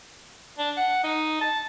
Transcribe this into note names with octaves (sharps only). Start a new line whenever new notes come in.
D4
F#5
D#4
A5